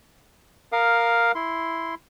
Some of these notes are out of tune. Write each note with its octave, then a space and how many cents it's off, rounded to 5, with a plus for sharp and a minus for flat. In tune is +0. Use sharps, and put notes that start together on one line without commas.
A#4 +0 F5 +5 D#6 -45
E4 +0 C6 -5